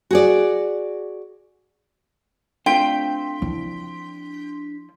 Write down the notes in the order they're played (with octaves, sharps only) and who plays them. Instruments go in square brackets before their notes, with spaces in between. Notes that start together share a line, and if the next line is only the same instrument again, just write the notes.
[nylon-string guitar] F#4 G#4 D5
[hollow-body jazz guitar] A3 C4 F4 [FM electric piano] D4 C6 B6 [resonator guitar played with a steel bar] G5
[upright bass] F3 E4